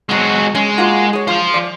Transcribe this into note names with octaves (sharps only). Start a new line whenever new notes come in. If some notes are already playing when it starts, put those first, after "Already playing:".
B2 F#3 G#3 C4 F#4
G#3 C#4
A#3 F4 F#4
G#4 C#5
F4 C5 F5
F3 D5